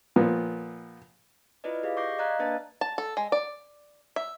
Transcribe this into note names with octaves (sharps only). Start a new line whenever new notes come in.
A#2 F3 B3
E4 F4 B4 D5 D#5
G4 G#4 D#5 F5
C#6 D6 G6 A#6 C7
D5 D#5 F5 A#5 F#6 G#6
A#3 D4 B4 D5 A5 A6
A5
A4
G#3
D5
E5